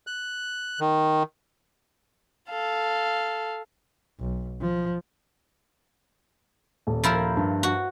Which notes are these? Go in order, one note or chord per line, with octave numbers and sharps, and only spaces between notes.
F#6
D#3
A4 F5
B1
F3
D#1
F3 E4 A#4
G2
F#4